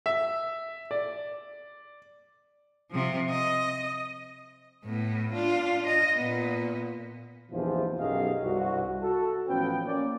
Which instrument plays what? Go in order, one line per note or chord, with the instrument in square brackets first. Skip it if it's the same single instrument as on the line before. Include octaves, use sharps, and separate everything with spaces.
[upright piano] E5
D5
[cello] C3 F3
D#5
A2 B3
D4 F4
D#5
A#2 B3
[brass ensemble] A#1 E2 G#2 C3 E3 F3
B1 F#2 G4 G#4 D#5 F5
C2 G2 F#4
F#4 A4
A1 F3 B3 C#4 B4 G5
A#3 C#4 D5